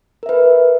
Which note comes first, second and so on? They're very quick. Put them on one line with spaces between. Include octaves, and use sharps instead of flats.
A#4 E5 B4